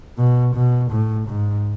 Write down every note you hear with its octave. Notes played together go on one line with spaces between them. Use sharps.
B2
B2
A2
G#2